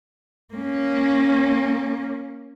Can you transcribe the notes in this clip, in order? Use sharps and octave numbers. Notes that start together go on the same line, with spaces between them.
A#3 C#4